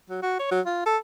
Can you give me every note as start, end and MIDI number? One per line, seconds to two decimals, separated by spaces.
0.10 0.21 54
0.22 0.37 66
0.40 0.47 73
0.51 0.60 54
0.66 0.82 65
0.86 0.97 69